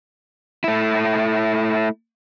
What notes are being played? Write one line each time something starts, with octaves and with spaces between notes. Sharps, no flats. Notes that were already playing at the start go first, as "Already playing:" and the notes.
A3 E4